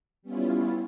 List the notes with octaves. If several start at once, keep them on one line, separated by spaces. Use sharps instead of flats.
G3 B3 C#4 E4 F4